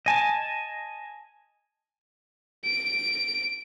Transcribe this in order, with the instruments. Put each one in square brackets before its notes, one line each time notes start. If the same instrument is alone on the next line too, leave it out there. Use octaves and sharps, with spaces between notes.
[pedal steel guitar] D#5 G#5 A5
[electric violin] D7